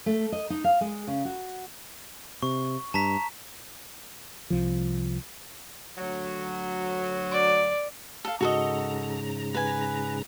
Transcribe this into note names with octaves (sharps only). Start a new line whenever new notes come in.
A3
D#5
D#4
F5
G#3
C#3
F#4
C3 C#6
G2 A5 A#5 B6
C2 F3
D2 F#3
D5
A4 F5
G#2 C#3 F#4 A4 D#5 A#5
B4 G#5